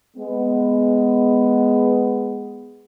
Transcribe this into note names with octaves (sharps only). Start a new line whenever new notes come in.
G#3 B3